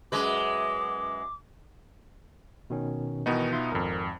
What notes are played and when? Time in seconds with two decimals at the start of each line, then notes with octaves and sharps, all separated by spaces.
0.12 F#2 G#3 B4 D6
2.70 B2 D#3 C#4
3.26 B2 D#3 E3 B3 D#4
3.52 F4 E5 C6
3.72 G#1 F2 A#4